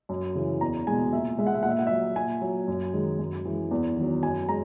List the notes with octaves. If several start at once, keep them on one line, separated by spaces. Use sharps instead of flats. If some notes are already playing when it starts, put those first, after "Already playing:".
F#2
C#3 E3
E2 A#5
B2 G#3 G#5
A#2 E5
G#3 E5
F#5
E5
A#2 F#5
E5
F#5
F#3 E5
A#2 G#5
F#3
F#2
D#3 G#3
F#2
E3 G#3
E2
D#3 F#3
F#2 G#5
G#3 A#5